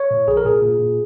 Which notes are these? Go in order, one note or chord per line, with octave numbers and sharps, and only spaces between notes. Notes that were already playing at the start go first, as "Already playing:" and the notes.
Already playing: C#5
A#2
A#1 G#4
A#4
A#2 G#4
A#2
A#2